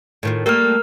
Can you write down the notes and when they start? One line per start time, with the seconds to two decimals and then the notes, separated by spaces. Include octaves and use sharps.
0.23 A2 D#3 F4
0.46 G3 A3 A#3 A#4 F6